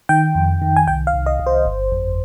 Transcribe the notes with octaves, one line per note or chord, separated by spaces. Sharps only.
D#3 G5
F2
D#3
G#5
C2 G5
F5
C2
D#5
C2
C5
G1
F2